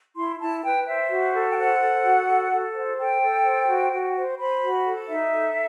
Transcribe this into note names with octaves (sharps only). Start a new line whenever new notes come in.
E4 C6
E4 A5
B4 G5
C5 E5
F#4
A4
G5
C5 F#5
A4
F#4
A4
A4
C5
A4 G5
A4
C5
F#4
F#4
C5
C5 B5
F#4
A4
D#4 E5
A4